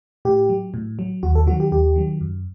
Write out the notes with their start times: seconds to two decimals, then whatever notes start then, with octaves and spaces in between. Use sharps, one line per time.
0.25 A2 G4
0.49 F#3
0.74 A2
0.99 F#3
1.23 D#2 F#4
1.35 A4
1.47 D#3 F#3 F#4
1.60 G4
1.72 D#2 G4
1.96 D#3 F#3
2.21 F#2